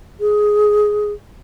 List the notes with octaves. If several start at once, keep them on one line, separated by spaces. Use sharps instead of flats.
G#4